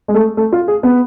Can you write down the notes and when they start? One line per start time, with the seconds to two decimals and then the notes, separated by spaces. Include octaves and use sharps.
0.08 G#3
0.14 A3
0.37 A3
0.52 F4
0.68 G#4
0.83 B3